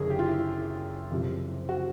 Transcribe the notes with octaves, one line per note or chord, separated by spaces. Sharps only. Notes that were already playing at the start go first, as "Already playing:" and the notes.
Already playing: F#1 F#2 D3 G#4 A#4
G4
F4
E4
F#1 F2 C3 F3
F#4